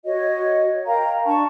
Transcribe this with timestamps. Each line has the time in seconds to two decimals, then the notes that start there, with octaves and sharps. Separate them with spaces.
0.05 F#4 C#5 D#5
0.86 A#4 F5 G5 A#5
1.26 D4 A5 C#6